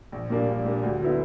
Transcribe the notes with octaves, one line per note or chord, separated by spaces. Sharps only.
A#1
A#2 G3 A#3 D4
A#1
A#2 G3 A#3 D4
D2
D3 F#3 B3 E4